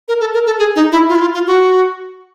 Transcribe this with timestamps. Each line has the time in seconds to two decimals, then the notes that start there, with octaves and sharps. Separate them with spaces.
0.08 A#4
0.20 A4
0.34 A#4
0.46 A4
0.59 G#4
0.76 D#4
0.92 E4
1.09 F4
1.15 E4
1.21 F4
1.34 F4
1.47 F#4